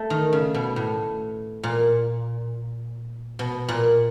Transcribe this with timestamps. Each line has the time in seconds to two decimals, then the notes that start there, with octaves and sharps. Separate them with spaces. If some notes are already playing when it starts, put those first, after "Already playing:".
Already playing: A3
0.10 D#3
0.33 C#3
0.54 B2
0.76 A2
1.63 A#2
3.39 B2
3.69 A#2